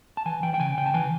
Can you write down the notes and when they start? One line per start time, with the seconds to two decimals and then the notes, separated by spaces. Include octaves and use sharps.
0.17 A5
0.26 E3 G#5
0.43 E3 G5
0.54 G5
0.60 C#3 G#5
0.77 C#3 G5
0.86 A5
0.94 E3 G#5